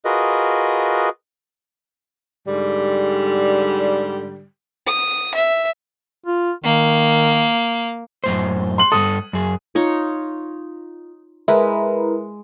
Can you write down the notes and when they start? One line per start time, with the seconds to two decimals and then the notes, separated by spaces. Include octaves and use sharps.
0.05 F4 F#4 G#4 A#4 B4 D#5
2.46 G#2 D3 G3
4.87 D#6
5.35 E5
6.26 F4
6.64 D#3 A#3
8.24 F#2 A2 C5
8.78 C6 F#7
8.92 G2 A#2 A4 D#6
9.33 F#2 G#4
9.75 D#4 F4 C#5
11.48 G#3 E4 A#4 B4